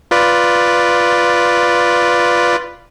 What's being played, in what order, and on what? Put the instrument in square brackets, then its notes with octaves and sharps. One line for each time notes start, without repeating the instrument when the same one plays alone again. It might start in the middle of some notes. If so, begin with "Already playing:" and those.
[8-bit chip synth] F4 B4 D5